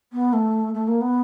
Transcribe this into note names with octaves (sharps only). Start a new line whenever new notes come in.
B3
A3
A3
A#3
B3